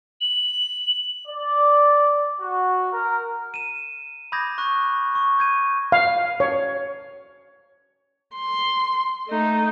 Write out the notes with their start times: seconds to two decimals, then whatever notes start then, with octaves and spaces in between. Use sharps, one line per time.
0.21 F#7
1.28 D5
2.41 F#4
2.93 A#4
3.54 D#7 E7
4.32 B5 D6 D#6 G6 G#6 A#6
4.58 C#6 F#6
5.15 C#6
5.39 G6 G#6 D#7
5.92 F5
6.40 C#5
8.36 C6
9.29 A3 D#4